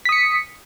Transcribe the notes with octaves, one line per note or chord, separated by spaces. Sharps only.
D#6 B6 C#7